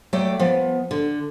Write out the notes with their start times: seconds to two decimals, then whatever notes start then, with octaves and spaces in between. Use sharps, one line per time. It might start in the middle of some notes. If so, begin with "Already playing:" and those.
0.13 F#3 A3 D5 G5
0.39 F3 B3
0.91 D3